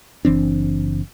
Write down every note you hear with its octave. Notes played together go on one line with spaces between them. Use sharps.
F#1 E3 C4 D4